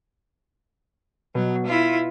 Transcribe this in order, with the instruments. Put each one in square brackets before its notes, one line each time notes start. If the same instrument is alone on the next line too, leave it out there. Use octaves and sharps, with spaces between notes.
[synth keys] B2 [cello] F#3
[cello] E4 F4